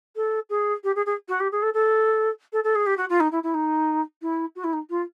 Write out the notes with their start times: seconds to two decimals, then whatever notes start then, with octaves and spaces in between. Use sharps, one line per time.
0.16 A4
0.50 G#4
0.84 G4
0.96 G#4
1.06 G#4
1.29 F#4
1.40 G4
1.52 G#4
1.62 A4
1.74 A4
2.53 A4
2.64 A4
2.75 G#4
2.86 G4
2.97 F#4
3.09 F4
3.20 D#4
3.32 E4
3.43 E4
3.54 D#4
4.22 E4
4.56 F#4
4.64 E4
4.73 D#4
4.90 F4